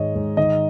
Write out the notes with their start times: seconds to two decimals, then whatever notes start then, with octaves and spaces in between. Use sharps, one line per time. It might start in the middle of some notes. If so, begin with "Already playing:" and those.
Already playing: G#2 D#3 G#3 C#5 D#5
0.15 G#2
0.37 D#3 D#5